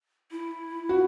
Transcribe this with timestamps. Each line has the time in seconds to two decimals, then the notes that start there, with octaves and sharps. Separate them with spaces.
0.31 E4
0.89 F#4